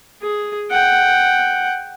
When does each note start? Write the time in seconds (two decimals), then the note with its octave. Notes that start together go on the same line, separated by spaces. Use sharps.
0.22 G#4
0.71 F#5 G5